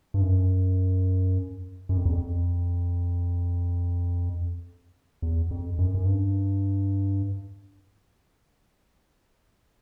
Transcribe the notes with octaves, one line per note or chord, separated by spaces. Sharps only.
G2
F#2
F#2
F2
E2
F2
E2
F2
F#2
F#2
G2